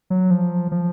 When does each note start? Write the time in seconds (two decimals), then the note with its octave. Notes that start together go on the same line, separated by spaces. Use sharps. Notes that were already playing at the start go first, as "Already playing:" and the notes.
0.10 F#3
0.31 F3
0.72 F3